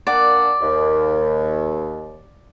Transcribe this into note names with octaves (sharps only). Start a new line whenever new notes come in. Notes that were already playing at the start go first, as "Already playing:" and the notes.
A#3 D4 D5 F#5
D#2